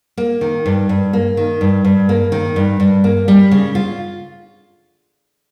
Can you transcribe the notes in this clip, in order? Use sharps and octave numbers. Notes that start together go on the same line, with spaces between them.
A#3
D#3
G2
G2
A#3
D#3
G2
G2
A#3
D#3
G2
G2
A#3
G3
C#3
F4